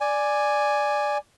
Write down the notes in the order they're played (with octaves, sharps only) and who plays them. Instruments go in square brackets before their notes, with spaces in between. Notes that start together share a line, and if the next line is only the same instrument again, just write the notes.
[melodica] D5 G#5